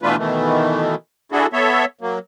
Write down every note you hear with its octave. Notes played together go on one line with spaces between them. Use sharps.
B2 E3 A3 D4 F4 B4
B2 D#3 E3 A3
D4 E4 F#4 G#4 A4
B3 A4 C#5 E5
F#3 A#3